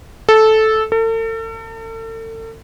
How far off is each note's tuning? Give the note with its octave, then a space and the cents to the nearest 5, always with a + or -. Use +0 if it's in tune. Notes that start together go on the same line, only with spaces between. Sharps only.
A4 -10
A4 +40